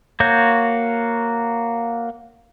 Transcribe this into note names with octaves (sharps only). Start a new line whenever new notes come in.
A#3 F#4 C#5 G6